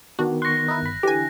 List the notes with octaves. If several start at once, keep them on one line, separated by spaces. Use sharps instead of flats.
D#3 B3 D4 F#4
C6 C#6 F#6 A#6
D#4 E4
G1 B5
D3 E3 G4 G#5